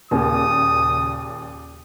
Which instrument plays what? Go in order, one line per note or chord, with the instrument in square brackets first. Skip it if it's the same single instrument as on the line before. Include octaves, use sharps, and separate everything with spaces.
[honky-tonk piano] D#2 A#2 C#3 [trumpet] D#6